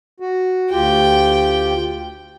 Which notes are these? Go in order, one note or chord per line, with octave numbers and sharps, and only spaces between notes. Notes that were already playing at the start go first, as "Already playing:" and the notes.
F#4
D2 F4 G4 G5